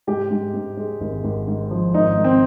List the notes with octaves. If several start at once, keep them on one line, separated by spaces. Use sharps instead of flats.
G#2 G4
G#2
G#2
G#3
G#1
G#1
G#2
F3
G#1 D#4
G#2
C4